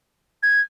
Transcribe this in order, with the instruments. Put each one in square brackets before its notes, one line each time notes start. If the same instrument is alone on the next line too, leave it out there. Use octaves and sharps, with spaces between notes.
[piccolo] G#6